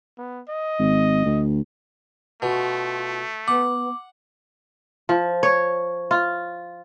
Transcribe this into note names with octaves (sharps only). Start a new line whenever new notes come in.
B3
D#5
G#1
D2
B2 A3 F4
B3 F#5 D6
F3
C#5
F4